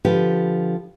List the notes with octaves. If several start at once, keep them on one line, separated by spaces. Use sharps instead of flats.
D3 F3 G4 B4